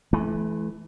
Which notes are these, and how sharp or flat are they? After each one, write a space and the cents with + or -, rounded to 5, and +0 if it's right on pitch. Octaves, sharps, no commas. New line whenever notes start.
E3 +0 A3 -40